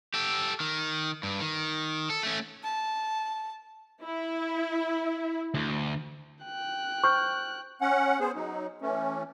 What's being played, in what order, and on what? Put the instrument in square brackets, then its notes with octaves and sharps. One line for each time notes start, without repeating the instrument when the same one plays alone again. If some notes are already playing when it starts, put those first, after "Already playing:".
[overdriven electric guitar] G4 A4
D#3
G2
D#3
A4
A3 C#4
[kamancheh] A5
[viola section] E4
[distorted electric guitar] D2
[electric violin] G5 F#6
[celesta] C5 F6 G6 [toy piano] C#6
[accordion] C#4 F#5
B3 G#4 C5
F#3 D#4
E3 A3 C#4